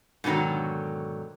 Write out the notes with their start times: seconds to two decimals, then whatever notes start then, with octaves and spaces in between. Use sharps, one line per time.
0.24 G#2 B2 D3 D#3 F#3